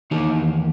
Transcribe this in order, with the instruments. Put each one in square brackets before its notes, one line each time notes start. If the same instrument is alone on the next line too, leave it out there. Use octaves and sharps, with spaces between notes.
[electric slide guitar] E2 D#3 D#4 G4